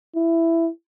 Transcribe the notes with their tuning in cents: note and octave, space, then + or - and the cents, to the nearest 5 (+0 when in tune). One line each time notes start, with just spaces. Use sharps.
E4 +10